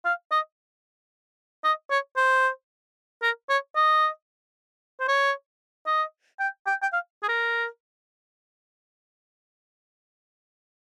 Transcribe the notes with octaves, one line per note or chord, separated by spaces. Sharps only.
F5
D#5
D#5
C#5
C5
A#4
C#5
D#5
C5
C#5
D#5
G5
G5
G5
F5
G#4
A#4